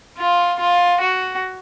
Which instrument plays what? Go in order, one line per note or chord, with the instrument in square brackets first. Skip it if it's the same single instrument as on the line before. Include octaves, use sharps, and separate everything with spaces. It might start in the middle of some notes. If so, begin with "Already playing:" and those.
[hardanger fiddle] F4
F4
F#4